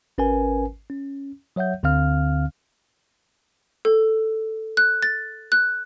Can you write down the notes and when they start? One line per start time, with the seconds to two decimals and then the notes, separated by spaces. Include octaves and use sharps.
0.18 G#1 C#4 A#4 B4 G#5
0.90 C#4
1.56 F#3 C#5 E5 F#5 G6
1.83 D2 D3 C4 F5 F6
3.85 A4
4.77 F#6
5.03 A6
5.52 F#6